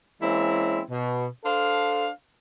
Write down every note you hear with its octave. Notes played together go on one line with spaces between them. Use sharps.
E3 G#3 A#3 C4 C#4 E4
B2
D4 A4 C5 F5